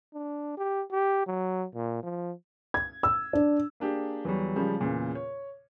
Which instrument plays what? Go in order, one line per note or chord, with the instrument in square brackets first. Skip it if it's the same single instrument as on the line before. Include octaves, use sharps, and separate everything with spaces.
[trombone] D4
G4
G4
F#3
A#2
F3
[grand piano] G#6
E6
D4
[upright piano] A#3 D4 G4 G#4
E2 F#3 G3
C#3 F3 G3 G#3
E2 A#2 C#3
C#5